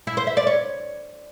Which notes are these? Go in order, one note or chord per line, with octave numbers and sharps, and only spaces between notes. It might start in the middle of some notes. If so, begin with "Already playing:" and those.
E4
C5
E5
D5
C#5